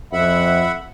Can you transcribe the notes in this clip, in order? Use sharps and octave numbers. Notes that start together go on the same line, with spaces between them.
F2 E5 F#5 B5